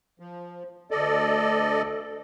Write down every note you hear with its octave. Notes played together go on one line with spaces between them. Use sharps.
F3
D2 A4 D5 D#5